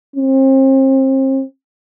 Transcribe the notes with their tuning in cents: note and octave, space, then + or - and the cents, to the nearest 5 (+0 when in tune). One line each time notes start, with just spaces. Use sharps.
C4 +35